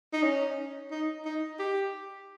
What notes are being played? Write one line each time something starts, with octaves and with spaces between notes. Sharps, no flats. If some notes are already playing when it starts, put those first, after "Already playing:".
D#4
C#4
D#4
D#4
G4